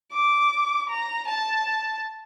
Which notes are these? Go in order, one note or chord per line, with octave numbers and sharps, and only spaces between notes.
D6
A#5
A5